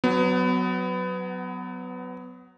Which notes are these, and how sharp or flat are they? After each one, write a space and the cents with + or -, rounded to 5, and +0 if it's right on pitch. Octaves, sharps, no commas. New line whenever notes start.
F#3 +0 B3 +25